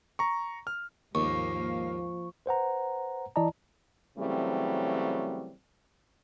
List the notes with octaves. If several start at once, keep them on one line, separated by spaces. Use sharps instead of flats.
A#5 C#6
F6
D#2 G#2 F3 A#3 F5 C#6
B4 C5 F#5 A#5
E3 E4 D5 D#5 A5 A#5
C#3 E3 F#3 G3 A3 C4